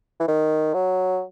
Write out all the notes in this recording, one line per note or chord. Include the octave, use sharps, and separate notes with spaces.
E3
D#3
F#3